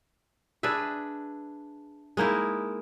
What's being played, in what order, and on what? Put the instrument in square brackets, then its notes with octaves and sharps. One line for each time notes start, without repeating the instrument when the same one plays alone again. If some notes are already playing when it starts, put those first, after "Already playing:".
[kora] D4 G#4 B4 E5
G#3 A#3 D#4 E4